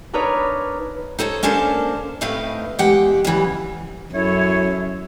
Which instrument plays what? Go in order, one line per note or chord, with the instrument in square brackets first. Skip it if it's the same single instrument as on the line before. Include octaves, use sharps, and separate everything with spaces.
[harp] D4 D#4 A#4 B4 C#5
[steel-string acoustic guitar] D#4 A4 C5 C#5
A#3 C#4 D4 A4 A#4 C5
A2 A3 C4 D#4 B4 F5
E2 G#3 G4 F#5 G5
F#2 C#3 E3 G3
[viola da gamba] F#2 [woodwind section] E4 A4 C#5